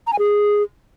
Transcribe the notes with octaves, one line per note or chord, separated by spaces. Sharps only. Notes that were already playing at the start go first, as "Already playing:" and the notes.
A#5
G#5
G#4